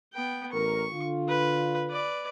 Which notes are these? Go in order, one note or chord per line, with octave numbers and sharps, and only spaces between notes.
B3 G5
A1 A#4 C#6
D3 F4
B4
B4 D5